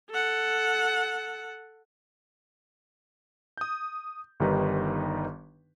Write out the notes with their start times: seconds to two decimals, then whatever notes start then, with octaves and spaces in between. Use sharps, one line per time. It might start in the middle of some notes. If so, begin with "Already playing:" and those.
0.10 A4 F#5
3.57 D#6 G6
4.40 G1 D#3 G3 D#4 B4